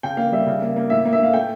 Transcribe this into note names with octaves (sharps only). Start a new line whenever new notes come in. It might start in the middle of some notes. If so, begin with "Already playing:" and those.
C#3 G5
A#3 F5
G3 E5
C#3
A#3
A#3
A2 E5
A#3
E5
A2 F5
A3 G5